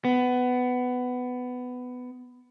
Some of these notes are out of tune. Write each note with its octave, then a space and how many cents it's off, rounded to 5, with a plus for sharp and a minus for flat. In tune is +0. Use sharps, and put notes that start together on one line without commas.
B3 +15